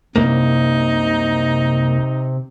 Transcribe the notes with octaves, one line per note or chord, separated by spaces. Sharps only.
C2 F#2 C3 A#3 D#4